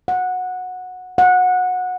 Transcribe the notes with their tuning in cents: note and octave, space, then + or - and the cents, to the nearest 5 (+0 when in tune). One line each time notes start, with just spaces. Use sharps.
F#5 -15
F#5 -20